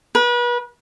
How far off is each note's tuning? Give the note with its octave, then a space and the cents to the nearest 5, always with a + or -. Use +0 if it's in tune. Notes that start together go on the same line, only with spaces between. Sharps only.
B4 -35